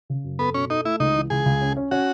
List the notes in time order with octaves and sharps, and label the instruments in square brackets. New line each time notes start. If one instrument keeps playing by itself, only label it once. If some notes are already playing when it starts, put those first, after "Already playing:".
[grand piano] C#3
F#2
[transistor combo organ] B3 [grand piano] A4
[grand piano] B2 [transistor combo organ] C#4
[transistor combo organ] D#4 [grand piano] A4
[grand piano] A3 [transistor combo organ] E4
[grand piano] C#2 [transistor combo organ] D#4
[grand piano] E3
[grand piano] C#2 [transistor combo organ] G#4
[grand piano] C#2
C#4
C#4
[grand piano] C#4 [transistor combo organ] F#4